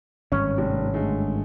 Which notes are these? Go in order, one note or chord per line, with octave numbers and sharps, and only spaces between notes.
G#1 G2 C#4
F1
D3 G#3 A3